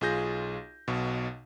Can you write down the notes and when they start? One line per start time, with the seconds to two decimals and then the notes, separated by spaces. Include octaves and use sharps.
0.01 B1 F4 G#4 G6 A#6
0.88 B1 B2